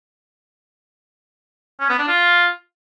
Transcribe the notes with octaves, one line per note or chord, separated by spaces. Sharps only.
C#4
B3
D4
F4